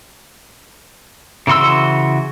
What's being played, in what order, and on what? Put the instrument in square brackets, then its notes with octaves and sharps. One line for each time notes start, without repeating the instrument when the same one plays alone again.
[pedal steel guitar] C#3 E3 F#4 C6 E6